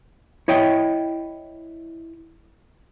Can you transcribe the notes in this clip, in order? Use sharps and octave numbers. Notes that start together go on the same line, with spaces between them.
E4 C#5 D#5 G5